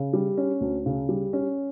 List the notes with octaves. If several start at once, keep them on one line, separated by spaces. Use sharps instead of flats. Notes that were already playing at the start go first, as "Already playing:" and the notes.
Already playing: C#3
G3
C#4
D2
C#3
G3
C#4